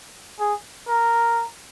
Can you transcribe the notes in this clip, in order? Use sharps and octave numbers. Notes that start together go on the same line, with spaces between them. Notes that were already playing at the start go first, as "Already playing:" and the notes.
G#4
A#4